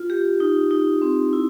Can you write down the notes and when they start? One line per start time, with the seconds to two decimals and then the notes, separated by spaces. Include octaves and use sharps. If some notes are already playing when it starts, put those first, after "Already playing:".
Already playing: F4
0.10 G4
0.40 D#4
0.71 D#4
1.02 C4
1.33 E4